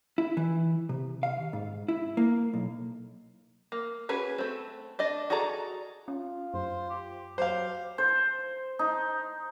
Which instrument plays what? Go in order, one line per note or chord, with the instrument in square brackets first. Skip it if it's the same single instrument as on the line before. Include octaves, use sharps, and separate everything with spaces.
[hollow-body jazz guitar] E4
E3
C3
F5
D#2
G#2
E4
A#3
B1
[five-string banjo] A#3
C#4 F#4 G#4 B4
A3 C4
D4 D5 D#5
F#4 G#4 A4 D5 A#5
[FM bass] C#4 [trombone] F4
[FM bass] F#2 [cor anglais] C5
[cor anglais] G4
[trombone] F#3 [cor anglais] G4 [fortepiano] C5 F5
[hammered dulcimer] C5
D#4